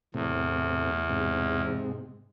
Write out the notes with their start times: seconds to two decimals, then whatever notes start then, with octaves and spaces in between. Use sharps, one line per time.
0.14 E2 A2 C3
1.09 G#2 C3